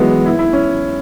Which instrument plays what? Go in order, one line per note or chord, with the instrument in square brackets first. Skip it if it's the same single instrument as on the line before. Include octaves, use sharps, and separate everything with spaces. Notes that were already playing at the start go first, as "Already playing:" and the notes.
Already playing: [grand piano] E3 F#3 G#3 B3
E4
E4
C#4